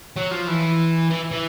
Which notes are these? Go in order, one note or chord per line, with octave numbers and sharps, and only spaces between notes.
F#3
F3
E3
E3
E3